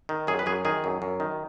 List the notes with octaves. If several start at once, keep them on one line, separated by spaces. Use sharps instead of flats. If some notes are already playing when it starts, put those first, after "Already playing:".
D#3
F#2 G#4
B4
F#2 G#4
D#3 G#4
F#2
F#2
D#3